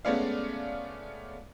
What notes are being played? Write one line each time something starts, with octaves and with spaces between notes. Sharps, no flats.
G#3 A3 B3 C#4 D5 F5